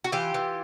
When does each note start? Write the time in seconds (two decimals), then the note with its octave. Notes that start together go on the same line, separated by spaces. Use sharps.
0.04 F#4
0.12 E3 F4 G4
0.34 E3